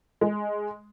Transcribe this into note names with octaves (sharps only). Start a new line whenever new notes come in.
G#3